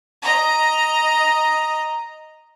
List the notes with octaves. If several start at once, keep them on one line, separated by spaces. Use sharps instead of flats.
D#5 A#5